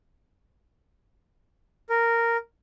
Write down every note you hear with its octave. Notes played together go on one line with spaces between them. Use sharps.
A#4